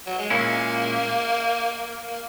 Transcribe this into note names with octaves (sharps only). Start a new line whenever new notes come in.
F#3
G#3
A#2 G#3 A#3 C#4 E4
A#3